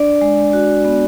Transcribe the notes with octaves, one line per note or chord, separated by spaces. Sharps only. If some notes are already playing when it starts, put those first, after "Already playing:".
Already playing: D4 D5
G#3
F#4
B3